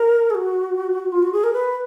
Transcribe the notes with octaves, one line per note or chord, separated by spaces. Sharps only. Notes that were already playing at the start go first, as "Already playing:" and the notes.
Already playing: A#4
G#4
F#4
F4
F#4
G#4
A#4
B4